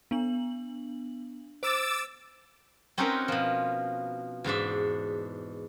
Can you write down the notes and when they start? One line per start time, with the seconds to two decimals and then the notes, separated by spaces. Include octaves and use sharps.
0.11 B3 D4 F#7
1.63 C5 D6 E6 A6
2.98 C4 C#4 D#4 F#4 A#4 B4
3.28 B2 F3
4.44 E2 G#2 D4 E5